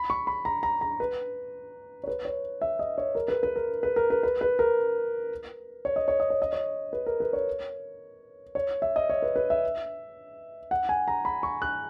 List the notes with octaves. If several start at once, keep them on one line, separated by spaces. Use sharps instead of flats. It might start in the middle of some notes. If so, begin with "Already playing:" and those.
Already playing: B5
C#6
B5
A#5
A#5
A#5
B4
C#5
B4
C#5
E5
D#5
C#5
A#4
B4
B4
A#4
B4
A#4
B4
B4
B4
A#4
C#5
D#5
C#5
D#5
C#5
D#5
C#5
B4
A#4
B4
C#5
C#5
E5
D#5
C#5
B4
B4
E5
F#5
G#5
A#5
B5
C#6
F#6